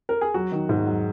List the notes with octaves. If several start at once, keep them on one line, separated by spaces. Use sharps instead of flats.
A#4
G#4
F#3 F#4
D#3
G#2
F#3